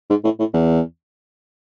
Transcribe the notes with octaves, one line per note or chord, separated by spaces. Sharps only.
G#2
A2
A2
E2